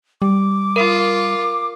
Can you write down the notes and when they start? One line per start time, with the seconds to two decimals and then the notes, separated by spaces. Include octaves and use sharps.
0.22 G3 D6
0.76 F4 A#4